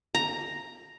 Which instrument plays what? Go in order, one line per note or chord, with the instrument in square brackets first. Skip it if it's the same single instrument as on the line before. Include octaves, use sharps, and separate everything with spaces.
[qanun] A#5